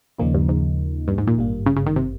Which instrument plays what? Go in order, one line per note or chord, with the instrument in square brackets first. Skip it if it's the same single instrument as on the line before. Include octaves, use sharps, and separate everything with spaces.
[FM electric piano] D#2 C#3 F3 A#3 D#4 [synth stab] A#2
[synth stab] G2
G#2
G2
G#2
A#2
[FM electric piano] G#1 G2 G3 A#3
[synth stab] C#3
C#3
D#3
C3